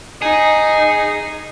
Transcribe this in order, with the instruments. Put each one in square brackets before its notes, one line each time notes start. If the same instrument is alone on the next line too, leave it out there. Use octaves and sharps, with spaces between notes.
[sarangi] D#4 [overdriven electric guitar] G#4